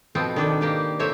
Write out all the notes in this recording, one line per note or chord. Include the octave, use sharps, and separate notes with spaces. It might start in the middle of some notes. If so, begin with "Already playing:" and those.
B2 F3 B3 C4
D#3 D4 A4
A#3 G4 B4
A2 C3 C4 G4 C#5 E5